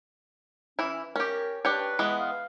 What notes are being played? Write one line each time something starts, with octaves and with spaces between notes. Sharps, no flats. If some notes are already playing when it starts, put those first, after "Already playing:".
E3 C#4 E4
C#4 G4 A#4
D4 G4 B4 C#5
E3 G#3 B3
F5